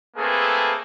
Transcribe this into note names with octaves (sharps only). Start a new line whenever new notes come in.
A3 A#3 C4 G#4 A4 B4